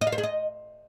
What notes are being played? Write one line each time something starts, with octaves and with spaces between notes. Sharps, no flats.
D#5
F5
C5
G#4
D#5